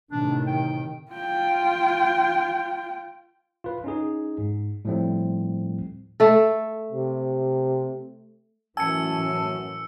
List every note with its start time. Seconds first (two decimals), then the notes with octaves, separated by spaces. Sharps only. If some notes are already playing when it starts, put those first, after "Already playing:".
0.11 A2 C3 D#3 D4
0.47 G5
1.12 F4 G5
3.64 F4 B4
3.84 C#4 D#4 G#4
4.38 G#2
4.85 A2 F3 G3 A3 C4
6.20 A3 A4
6.92 C3
8.77 F#2 A2 E3 C#4 G#5 A5 E6 C#7